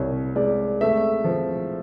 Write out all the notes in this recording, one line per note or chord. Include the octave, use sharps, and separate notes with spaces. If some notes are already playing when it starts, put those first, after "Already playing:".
Already playing: C2 C3 C#5
G#3 D5
A3 E5
F3